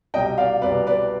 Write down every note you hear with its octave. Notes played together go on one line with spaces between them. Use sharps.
C2 B2 D#5 G5
D5 F5
C2 B2 B4 D5
B4 D5